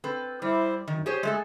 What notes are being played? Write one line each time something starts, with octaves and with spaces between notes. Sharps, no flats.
C4 A4 B4
G3 E4 C5 D5
F#2 D#3
G4 G#4 C5 C#5
G#3 A3 G#4 A4